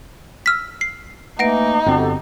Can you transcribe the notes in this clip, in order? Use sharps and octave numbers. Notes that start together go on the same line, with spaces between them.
E6 F6 B6
C7
E3 A3 A#3 D#4 F#5 A#6 D7
G1 C4 F#4 G4 A4